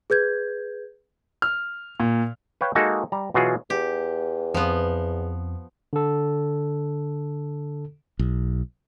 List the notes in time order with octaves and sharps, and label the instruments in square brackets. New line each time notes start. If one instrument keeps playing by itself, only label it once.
[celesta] G#4 B4 G6 G#6
[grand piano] F6
A#2
[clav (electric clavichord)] B4 C#5 F5 G5
G#3 A#3 D#4 F#4 A4
G3 A#5
B2 E3 F#3 F4 F#4 G#4
[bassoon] E2 [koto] G4
[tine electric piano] F2 [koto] F3 B3
[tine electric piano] D3 A4
[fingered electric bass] B1